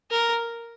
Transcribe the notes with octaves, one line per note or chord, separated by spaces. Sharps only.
A#4